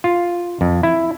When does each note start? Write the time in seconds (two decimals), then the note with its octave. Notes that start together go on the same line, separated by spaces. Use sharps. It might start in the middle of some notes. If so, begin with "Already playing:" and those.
0.04 F4
0.61 F2
0.83 E4